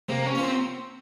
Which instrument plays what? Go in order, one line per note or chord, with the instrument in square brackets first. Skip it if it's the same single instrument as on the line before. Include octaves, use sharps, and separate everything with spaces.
[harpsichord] C3 [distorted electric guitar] A#3
[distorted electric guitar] C#4
[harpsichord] F3 A#3
[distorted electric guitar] C4